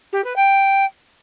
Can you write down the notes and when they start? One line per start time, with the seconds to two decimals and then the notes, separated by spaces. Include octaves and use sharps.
0.13 G4
0.24 B4
0.36 G5